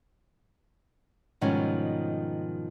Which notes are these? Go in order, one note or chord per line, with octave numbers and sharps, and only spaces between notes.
G#2 B2 D#3 F3 G3 C#4